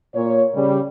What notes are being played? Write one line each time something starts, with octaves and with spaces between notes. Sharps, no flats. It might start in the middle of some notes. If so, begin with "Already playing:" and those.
A#2 C#5
C#3 G3